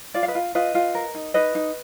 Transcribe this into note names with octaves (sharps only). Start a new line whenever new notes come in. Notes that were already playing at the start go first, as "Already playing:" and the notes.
F4 D5
F5
B4 D#5
F4
F4 B4 D#5
F4
A#4
D#4
D#4 B4 D#5
D#4